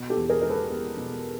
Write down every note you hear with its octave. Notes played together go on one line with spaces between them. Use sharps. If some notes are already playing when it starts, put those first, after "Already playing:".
Already playing: B2
G4 A4
E2
G#4 A#4
G#3 A#4
A4 B4
B3
B2